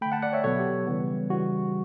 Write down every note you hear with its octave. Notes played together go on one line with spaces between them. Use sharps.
D3 A3 G5 B5
F#5 A5
D5 F#5
C#5 E5
B2 F#3 B3 A4 C#5
G4
C#3 E3 G3 B3
C#3 E3 G3 F#4